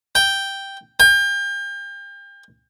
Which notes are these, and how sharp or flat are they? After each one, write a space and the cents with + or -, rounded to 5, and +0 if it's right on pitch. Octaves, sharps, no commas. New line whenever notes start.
G5 +0
G5 +35